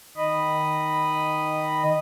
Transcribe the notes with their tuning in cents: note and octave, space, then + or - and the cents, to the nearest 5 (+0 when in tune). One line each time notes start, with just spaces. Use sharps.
D#3 +0 D#5 -10 B5 +0